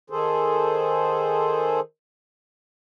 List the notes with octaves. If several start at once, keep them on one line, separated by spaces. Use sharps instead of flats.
D#3 G#4 A4 C5